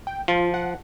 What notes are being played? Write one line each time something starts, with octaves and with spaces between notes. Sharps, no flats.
G5
F3 F4
F#5